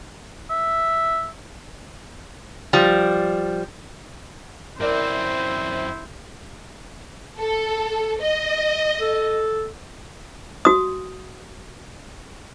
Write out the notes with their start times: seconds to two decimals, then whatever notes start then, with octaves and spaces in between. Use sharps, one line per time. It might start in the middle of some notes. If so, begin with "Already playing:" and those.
0.50 E5
2.73 F3 G3
4.80 F#2 C4 E4 A#4 C5 D5
7.38 A4
8.21 D#5
9.01 A4
10.65 F#4 D#6